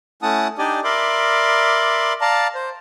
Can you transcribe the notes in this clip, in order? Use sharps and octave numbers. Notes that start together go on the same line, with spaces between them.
A3 C#4 E4 F#5 A5 D#6
D4 D#4 G4 D5 D#5 G#5
A#4 D5 E5 B5 C6 D6
D5 F5 A5 A#5
C5